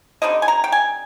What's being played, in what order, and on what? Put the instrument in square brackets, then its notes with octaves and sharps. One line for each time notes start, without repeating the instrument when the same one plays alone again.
[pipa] D3 G3 C4 D#4 D#5
G#5
A#5
G5
G#5